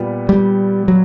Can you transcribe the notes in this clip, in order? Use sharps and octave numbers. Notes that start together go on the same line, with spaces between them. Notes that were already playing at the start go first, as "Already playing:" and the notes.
Already playing: A#2 G3 B3
G3
F#3